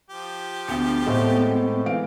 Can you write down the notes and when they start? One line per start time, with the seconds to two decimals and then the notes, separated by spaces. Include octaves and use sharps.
0.10 F3 G4
0.68 D2 B3
1.06 A2 G#3 A3 C4
1.86 E3 F5 D7